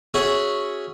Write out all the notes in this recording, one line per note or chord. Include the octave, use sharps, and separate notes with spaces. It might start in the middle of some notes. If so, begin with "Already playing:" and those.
C#4 F#4 G#4 C#5 E5 F#5